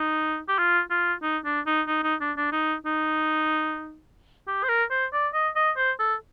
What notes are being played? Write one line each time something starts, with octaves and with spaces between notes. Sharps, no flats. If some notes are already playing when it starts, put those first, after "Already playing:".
Already playing: D#4
G4
F4
F4
D#4
D4
D#4
D#4
D#4
D4
D4
D#4
D#4
G4
C5
A#4
C5
D5
D#5
D#5
C5
A4